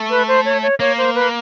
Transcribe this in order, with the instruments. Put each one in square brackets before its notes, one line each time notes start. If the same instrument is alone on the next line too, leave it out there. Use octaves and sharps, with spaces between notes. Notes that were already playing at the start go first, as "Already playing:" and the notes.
Already playing: [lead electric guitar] A3
[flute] B4
C5
C#5
C#5
[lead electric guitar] A#3 [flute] C#5
[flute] C5
B4